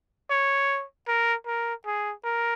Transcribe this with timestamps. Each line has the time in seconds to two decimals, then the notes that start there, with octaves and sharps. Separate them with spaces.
0.30 C#5
1.08 A#4
1.47 A#4
1.86 G#4
2.24 A#4